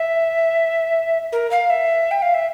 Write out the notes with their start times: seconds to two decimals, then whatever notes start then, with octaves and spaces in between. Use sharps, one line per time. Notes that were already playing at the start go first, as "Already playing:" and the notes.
Already playing: E5
1.32 A#4
1.51 F5
1.70 E5
2.11 G5
2.22 F5
2.34 E5